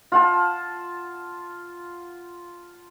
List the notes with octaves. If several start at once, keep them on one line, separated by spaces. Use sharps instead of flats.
F4 F#5 A5